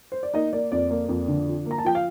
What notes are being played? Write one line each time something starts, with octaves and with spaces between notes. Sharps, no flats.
C5
D5
A#3 D#4 D#5
A#3 D5
F2 D5
A#3 D5
F2
D3
F3
A#3
A#5
A5
F3 G5
F5